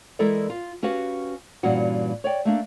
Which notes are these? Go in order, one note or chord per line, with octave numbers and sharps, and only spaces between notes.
E3 G#3 E4 A4 A#4 D5
F4
C#4 F#4 G4 B4 F5
G2 A#2 E3 G3 C#4 F#4
C#5 D5 G5
A3 A#3 D4